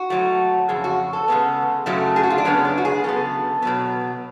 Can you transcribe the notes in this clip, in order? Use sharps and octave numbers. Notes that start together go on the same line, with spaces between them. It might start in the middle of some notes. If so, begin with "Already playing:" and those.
Already playing: F#4
G#2 F#3 A3
F2 C#3 G#4
F#4
A4
C#3 G#3 B3
F#2 C#3 F#3 A3
G#4
F#4
F4
D4
F#2 C#3 G#3 B3 C#4
D4
F#4
G#4
C#3 F#3 B3 A4
B2 F#3 B3